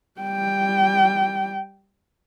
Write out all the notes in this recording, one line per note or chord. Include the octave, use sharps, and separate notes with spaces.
G3 G5